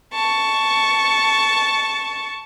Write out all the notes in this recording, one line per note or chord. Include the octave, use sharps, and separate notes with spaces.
A5 C#6